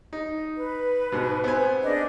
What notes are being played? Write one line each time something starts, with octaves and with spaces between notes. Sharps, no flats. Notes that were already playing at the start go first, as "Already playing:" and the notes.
D#4
B4
G#2 B2
B3 C4 G#5
D4 G#4 D#5